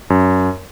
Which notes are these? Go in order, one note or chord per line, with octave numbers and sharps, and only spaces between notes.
F#2